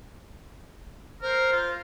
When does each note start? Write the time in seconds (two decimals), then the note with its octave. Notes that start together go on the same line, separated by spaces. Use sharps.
1.22 A#4 C5
1.52 F4